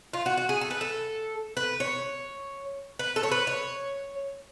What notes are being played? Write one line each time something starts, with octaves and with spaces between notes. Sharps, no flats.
F4
F#4
F#4
G#4
A4
B4
A4
B4
C#5
B4
A4
C#5
B4
C#5